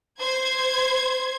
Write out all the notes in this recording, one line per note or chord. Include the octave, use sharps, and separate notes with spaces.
C5 G#6